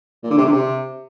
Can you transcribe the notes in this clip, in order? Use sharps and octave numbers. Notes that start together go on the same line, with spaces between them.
A#2
D3
C3
D3
C3